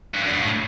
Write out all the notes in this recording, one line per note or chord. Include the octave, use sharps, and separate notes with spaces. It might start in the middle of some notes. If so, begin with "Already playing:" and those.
G2
F#2
G2
A2